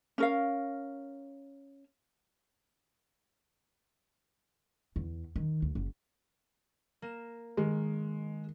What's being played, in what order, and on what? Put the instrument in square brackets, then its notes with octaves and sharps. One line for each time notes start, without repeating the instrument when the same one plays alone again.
[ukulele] C#4 A#4 F5
[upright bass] E2
D#3
D2
F#1
[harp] A#3 E7
[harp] D#3 [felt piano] G#3